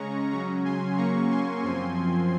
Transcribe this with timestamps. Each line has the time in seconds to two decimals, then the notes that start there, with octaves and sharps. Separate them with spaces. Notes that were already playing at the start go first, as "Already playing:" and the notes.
Already playing: C#3 G#3 C#4 A#5 C#6
0.31 C#3 F#3 C#4 A#5 C#6
0.65 G#5 C6
0.98 C#3 F#3 A#3 C#4 A#5 C#6
1.30 G#5 C6
1.63 F#2 F3 C4 G#5 C6